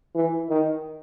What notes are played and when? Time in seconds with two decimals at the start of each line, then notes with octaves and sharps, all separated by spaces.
0.15 E3
0.50 D#3